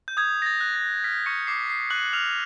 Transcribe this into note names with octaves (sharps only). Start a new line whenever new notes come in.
G6
D#6 G#6
A#6
A6
F#6
A#6
F6 B6
C#6 C#7
D6 C7
C7
C#6 F#6 F#7
F6 F7